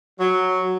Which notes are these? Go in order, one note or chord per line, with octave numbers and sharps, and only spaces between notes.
F#3